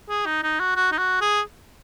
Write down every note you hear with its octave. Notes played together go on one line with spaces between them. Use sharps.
G#4
D#4
D#4
F#4
F#4
D#4
F#4
G#4